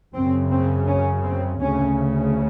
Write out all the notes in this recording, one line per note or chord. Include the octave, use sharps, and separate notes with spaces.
F#2 C#3 C4
C4
C#4
C4
D2 C#3 C#4